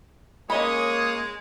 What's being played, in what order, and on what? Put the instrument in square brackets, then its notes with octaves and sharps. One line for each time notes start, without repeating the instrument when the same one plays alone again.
[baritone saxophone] G#3 [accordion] A#3 D#6 [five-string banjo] C#4 D#5 B5 [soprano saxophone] C#5